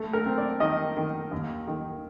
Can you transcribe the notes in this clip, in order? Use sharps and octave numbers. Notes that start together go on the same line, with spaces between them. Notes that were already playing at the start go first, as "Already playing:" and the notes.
Already playing: A3
A#4
C4
D5
D#3 D#5
D#3
D#2
D#3